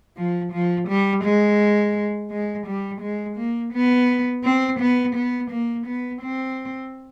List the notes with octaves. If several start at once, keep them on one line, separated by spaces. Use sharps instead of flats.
F3
F3
G3
G#3
G#3
G3
G#3
A#3
B3
C4
B3
B3
A#3
B3
C4